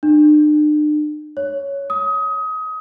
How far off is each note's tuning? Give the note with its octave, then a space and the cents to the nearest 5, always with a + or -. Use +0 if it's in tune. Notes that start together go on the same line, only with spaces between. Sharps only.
D4 +45
C#5 +5
D#6 +25